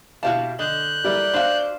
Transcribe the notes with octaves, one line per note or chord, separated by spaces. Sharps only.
B2 E4 F#4 G4 F5 A5
D3 D#5 F#6 G6
G3 E4 A#4 D5
D4 F#4 C5 E5 F5